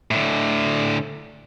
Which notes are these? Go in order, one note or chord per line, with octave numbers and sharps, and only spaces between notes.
A2 D3